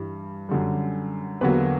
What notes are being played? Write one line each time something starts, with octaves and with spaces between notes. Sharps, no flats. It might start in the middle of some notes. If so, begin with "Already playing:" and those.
Already playing: G2 E3 G3
F#2 D3 G3
E2 D3 F#3 A#3 G4 B4